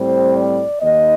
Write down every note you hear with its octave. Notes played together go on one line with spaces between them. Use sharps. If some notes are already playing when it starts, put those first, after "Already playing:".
Already playing: A2 G3 C4 C5
D5
D#2 D#3 A#3 D#5